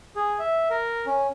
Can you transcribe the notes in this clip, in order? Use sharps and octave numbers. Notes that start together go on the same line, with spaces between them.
G#4
E5
A#4
C#4